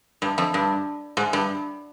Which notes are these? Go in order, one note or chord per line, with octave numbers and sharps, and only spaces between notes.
G2
F2
G2
G#2
G2